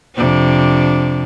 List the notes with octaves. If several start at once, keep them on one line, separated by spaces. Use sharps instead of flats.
F2 C3 D4